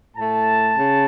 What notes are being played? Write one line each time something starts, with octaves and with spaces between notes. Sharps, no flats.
A2 A3 A5
C#3